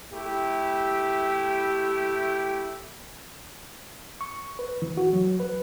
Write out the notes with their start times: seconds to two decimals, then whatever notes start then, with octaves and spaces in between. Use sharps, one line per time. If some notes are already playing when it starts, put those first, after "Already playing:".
0.13 A3 E4 G4
4.21 C#6
4.59 B4
4.82 E3
4.97 F#4
5.13 F#3
5.40 B4